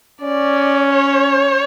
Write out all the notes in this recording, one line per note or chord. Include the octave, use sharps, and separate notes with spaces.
C#4 D5
C#5